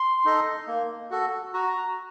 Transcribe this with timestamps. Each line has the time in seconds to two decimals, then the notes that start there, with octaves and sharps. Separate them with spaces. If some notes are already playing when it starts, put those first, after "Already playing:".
Already playing: C6
0.25 D#4 A4 D#5
0.68 A#3
1.11 F#4 A4
1.54 F#4 A#5